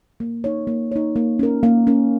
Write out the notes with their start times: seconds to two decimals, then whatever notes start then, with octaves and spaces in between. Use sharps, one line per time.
0.20 A#3
0.44 D#4 C#5
0.67 A#3
0.92 D#4 C#5
1.16 A#3
1.39 C#4 A#4
1.63 A#3
1.87 C#4 A#4